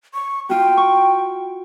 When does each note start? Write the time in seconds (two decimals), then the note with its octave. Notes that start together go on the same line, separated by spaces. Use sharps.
0.14 C#6
0.49 F4 F#4 G5
0.77 C#6